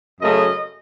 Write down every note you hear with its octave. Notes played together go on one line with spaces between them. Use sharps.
F#2 C#3 A3 D#5